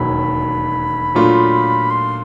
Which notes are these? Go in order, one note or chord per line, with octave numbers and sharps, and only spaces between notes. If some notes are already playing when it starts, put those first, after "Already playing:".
Already playing: E1 D#2 D#3 F#3 B5
A#2 F#3 A3 D4 F4
C6